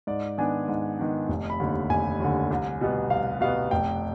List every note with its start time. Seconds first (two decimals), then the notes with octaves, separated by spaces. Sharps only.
0.07 G#2 D5
0.38 D#3 B3 D4 G#5
0.68 G#2
0.99 D#3 B3 D4
1.28 F1
1.50 B5
1.60 D#2 D3
1.90 F1 G#5
2.20 D#2 D3
2.51 C2
2.81 B2 G3 B3
3.10 C2 F5
3.41 B2 G3 B3 F5
3.71 F1 G5